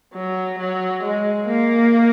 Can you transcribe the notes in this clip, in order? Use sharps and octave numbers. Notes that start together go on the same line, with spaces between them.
F#3
F#3
G#3
A#3